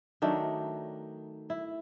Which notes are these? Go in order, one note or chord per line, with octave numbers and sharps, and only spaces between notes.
D#3 F#3 A3 D4
E4